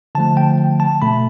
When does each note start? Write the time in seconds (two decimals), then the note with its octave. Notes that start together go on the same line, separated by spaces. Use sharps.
0.15 D3 F3 A3 A5
0.37 G5
0.80 A5
1.02 B2 A3 B5